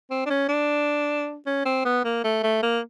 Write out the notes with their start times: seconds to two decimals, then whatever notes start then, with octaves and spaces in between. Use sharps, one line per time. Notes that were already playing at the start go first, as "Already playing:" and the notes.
0.11 C4
0.26 D4
0.30 C#4
0.49 D4
1.47 C#4
1.66 C4
1.85 B3
2.05 A#3
2.24 A3
2.43 A3
2.63 A#3